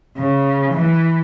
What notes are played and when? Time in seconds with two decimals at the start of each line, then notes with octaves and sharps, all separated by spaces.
0.17 C#3
0.74 E3